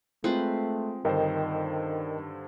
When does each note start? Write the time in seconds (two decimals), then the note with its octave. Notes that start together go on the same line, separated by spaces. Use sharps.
0.24 G#3 A3 C4 F4 B4
1.05 G2 D3 D#3 A#4 C5 D#5 G5